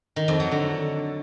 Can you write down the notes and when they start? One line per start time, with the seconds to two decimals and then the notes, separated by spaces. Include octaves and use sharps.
0.16 D#3
0.28 F2
0.40 F#3
0.51 D3